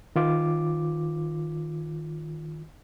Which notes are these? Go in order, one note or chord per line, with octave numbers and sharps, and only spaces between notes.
D#3 F4 D6